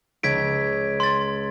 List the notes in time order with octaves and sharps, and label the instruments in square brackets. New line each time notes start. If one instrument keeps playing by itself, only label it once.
[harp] C#2 [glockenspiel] G#6 B6 D7
[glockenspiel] C6 A6